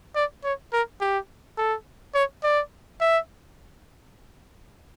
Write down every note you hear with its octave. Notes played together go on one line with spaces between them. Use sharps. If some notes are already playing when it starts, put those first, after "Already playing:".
D5
C#5
A#4
G4
A4
C#5
D5
E5